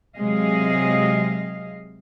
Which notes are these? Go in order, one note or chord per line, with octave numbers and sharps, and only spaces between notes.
C3 F#3 G#3 G#4 D#5 F5